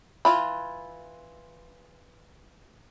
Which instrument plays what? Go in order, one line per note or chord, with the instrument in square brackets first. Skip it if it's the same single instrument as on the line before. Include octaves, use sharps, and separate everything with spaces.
[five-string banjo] E3 F4 B5